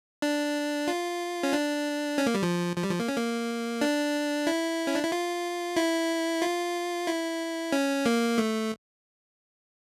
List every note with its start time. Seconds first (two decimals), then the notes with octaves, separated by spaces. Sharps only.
0.22 D4
0.88 F4
1.43 C#4
1.53 D4
2.18 C#4
2.26 A#3
2.34 G3
2.43 F3
2.76 F3
2.83 G3
2.91 F3
3.00 A#3
3.08 C#4
3.17 A#3
3.81 D4
4.47 E4
4.87 C#4
4.95 D4
5.03 E4
5.12 F4
5.76 E4
6.42 F4
7.07 E4
7.72 C#4
8.06 A#3
8.38 A3